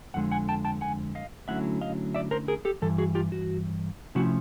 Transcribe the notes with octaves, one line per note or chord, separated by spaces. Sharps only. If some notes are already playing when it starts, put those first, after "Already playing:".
F2 D3 F3 G#3 F#5
F#5 G#5
G5 A5
G5 A5
F#5 G#5
D#5 F5
D3 F#3 A3 C#4 E4 E5 F#5
D#5 F5
D5 E5
A#4 C5
G#4 A#4
G4 A4
G2 E3 A4
F#4 G#4
F4 G4
F#4
C3 F3 A3 C#4 E4 F#4